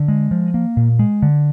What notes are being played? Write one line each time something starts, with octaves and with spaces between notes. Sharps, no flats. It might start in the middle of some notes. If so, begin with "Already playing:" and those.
Already playing: D3
G#3
F3
A#3
A#2
G#3
D3